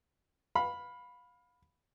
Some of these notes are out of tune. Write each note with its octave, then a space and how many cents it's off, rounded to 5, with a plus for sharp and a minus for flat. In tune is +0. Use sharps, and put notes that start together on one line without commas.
F5 +25 B5 +0